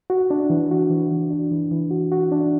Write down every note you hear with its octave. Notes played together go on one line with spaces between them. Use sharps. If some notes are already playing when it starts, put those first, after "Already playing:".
F#4
D4
E3
F#4
E3
E3
D4
E3
E3
F#4
F#4
D4